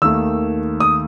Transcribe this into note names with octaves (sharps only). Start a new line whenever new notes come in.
D#2 D#3 A3 E6
D#6